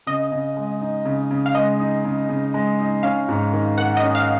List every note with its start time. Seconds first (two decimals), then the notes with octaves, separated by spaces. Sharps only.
0.07 C#3 D#5
0.32 C#3
0.57 G#3
0.81 D#4
1.05 C#3
1.31 C#3
1.46 F5
1.55 G#3 D#5
1.80 D#4
2.05 C#3
2.29 C#3
2.54 G#3
2.79 D#4
3.03 C#4 F5
3.29 G#2
3.53 D#3
3.78 A#3 F#5
3.97 D#5
4.03 C#4
4.15 F5